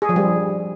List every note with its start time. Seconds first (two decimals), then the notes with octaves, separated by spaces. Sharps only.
0.02 G#4
0.09 F3
0.16 G3